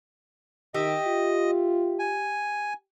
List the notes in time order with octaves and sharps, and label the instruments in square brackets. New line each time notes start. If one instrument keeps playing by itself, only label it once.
[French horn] D#3 [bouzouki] G4 E5 [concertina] D#5
[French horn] F4
[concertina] G#5